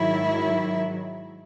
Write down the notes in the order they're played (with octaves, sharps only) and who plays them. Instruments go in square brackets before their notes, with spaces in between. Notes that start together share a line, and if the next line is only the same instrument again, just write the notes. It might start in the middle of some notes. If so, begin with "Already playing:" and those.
Already playing: [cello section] G#2 D#3 F#3 E4